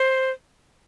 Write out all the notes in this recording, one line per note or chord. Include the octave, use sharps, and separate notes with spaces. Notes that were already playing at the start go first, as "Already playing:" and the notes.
Already playing: C5